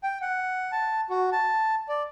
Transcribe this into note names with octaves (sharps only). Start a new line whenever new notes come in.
G5
F#5
A5
F#4
A5
D5